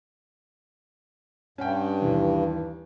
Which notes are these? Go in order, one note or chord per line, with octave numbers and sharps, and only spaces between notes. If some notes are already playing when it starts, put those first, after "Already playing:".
G2 C#4 F#5 G5
D#2 E3